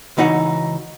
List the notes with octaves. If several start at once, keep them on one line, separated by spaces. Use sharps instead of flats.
C#2 E3 D#4 F#4 F#5